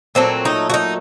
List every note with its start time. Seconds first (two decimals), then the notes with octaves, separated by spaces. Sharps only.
0.15 A#2 F#3 A3 C4
0.45 D#4
0.70 F#4
0.74 D#4